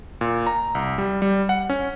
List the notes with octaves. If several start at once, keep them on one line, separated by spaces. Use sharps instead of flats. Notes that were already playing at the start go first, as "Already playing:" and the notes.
A#2
A#5
C2
G3
G3
F#5
C#4